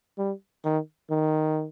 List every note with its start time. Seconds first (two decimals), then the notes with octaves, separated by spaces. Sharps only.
0.18 G3
0.64 D#3
1.11 D#3